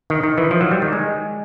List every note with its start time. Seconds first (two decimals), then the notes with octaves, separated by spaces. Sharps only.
0.10 D#3
0.23 D#3
0.38 E3
0.51 F3
0.61 F#3
0.71 G3
0.82 D#3
0.93 G#3